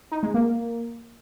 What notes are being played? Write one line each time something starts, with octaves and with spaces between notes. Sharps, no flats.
D#4
G#3
A#3